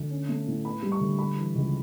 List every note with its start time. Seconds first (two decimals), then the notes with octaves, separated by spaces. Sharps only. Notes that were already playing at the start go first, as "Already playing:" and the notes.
Already playing: D2
0.10 C#4
0.29 A3
0.47 A2
0.65 B3 B5
0.82 G3
0.92 C#6
1.01 D2
1.19 G3 B5
1.37 E3
1.55 C#2